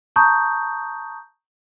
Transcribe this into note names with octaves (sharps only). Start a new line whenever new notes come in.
A5 A#5 C#6 D#6 G6